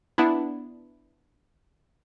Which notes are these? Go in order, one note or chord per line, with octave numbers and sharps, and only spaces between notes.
B3 D4 E4